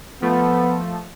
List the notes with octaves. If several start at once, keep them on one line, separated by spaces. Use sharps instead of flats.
F3 A3 B3